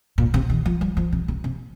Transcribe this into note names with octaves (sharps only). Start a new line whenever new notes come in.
A#2
C3
D#3
F3
G3
F3
C3
C3
C3